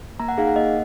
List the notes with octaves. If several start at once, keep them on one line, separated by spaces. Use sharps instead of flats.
A#3 A#5
F#5
D#4 G#4 F5
F#5
A#3 D#5